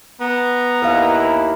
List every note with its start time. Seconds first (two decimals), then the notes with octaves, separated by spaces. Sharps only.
0.21 B3 A#5
0.82 D#2 D#3 E4 B4 F5